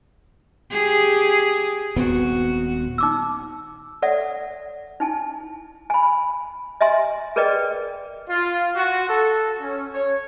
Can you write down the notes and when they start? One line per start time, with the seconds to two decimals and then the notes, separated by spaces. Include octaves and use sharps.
0.70 G4 G#4
1.96 D#1 B3 C4 F#4
2.98 D#4 D6 E6
4.02 A4 C#5 D5 E5 F#5
5.00 D#4 E4 G#5 A5
5.90 G#5 B5
6.81 D#5 E5 G#5 C6
7.36 G#4 A#4 B4 D5 D#5 G5
8.28 F4
8.75 F#4
9.08 A4
9.60 C#4
9.94 C#5